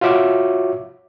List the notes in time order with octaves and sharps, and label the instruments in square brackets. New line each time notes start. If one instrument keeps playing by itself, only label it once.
[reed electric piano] F4 F#4 C#5 E5 D6